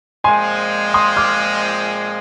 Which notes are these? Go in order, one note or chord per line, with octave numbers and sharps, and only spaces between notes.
A#2 F3 G#3 C4 G#5 C6
C6 D#6
D6 F6